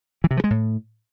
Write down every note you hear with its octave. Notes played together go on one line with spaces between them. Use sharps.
E3
C3
F3
G#3
A2